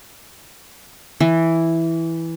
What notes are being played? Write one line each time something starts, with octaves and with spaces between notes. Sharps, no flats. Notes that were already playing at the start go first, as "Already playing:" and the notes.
E3